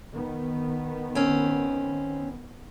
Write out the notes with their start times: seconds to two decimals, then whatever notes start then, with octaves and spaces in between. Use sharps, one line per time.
0.13 D#3 B3
1.15 C4 C#4